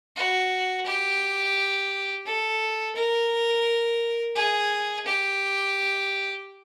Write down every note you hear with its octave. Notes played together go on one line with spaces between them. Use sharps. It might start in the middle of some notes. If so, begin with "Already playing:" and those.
F#4
G4
A4
A#4
G#4
G4